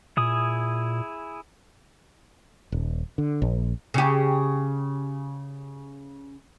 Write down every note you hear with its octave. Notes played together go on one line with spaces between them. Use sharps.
A#2 E4 G#4 D#6
D#1
D3
A#1
C#3 G4